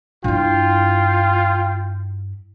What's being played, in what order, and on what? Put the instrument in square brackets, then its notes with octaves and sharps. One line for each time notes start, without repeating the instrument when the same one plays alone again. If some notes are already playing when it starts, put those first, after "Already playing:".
[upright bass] G2 E4 [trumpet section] F4 G5